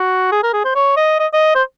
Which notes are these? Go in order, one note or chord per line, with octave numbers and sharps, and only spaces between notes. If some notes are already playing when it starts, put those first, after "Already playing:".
Already playing: F#4
G#4
A#4
G#4
C5
C#5
D#5
D#5
D#5
C5